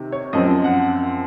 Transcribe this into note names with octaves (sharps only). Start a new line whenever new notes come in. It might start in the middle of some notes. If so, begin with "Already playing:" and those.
Already playing: C3 D#3
C#5
F#2 F3 C4 D#5
F#5